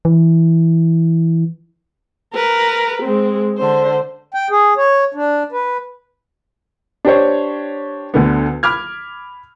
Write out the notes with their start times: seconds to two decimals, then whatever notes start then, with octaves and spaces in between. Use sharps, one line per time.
0.05 E3
2.33 A#4 B4
3.02 G#3 C4
3.58 D3 C5
4.34 G5
4.50 G#4
4.77 C#5
5.14 D4
5.52 B4
7.05 D4 G4 C5 C#5
8.14 D2 D3 B3
8.63 B5 D6 F6 G#6